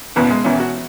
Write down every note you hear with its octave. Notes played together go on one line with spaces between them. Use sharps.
F#1 E2 B2 B3
G#3
E1 E2 E3 C#4
F#4